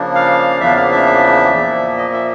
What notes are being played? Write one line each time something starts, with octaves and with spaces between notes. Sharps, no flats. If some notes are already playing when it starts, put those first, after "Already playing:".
Already playing: C#3 F3 A#3 D4
F5
E2 C#3 F3 A#3 D4 E5
F5
E5
A#2 F3 A#3
D#5
E5